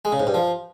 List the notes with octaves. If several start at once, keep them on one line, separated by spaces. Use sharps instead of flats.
G#3
C#3
G#2
G2
F3